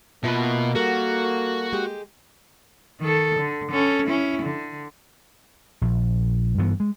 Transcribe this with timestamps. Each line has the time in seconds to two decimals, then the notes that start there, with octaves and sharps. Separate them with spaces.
0.24 B2 A#3 F4 B4 E5 A5
0.75 G3 F#4 A4 A#4
1.73 G#3 G4
3.01 D#3 A4
3.39 D3
3.71 C#4 A4
4.07 C#4 E4
4.42 D3
5.81 A#1
6.58 G2 E3 B3
6.80 G#3